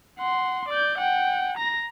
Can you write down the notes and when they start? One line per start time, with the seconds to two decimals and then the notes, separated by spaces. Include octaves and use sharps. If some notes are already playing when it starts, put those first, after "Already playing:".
0.18 F#5 C6
0.69 D5 G6
0.98 F#5 G5
1.57 A#5 A#6